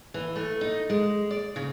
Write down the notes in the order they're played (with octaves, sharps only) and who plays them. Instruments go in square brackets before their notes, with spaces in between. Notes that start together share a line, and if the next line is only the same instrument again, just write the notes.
[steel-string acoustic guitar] E3
A3
D#4
G#3
D5
C#3